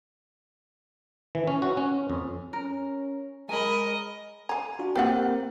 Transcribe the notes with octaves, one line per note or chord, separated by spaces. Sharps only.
E3
C#4
F#4
C#4
F2
C#4 A#4
G#3 A#4 D#5 G#5 B5
F5 G#5 A#5
D4 F4 F#4
A#3 C4 G4 A#4 F5 F#5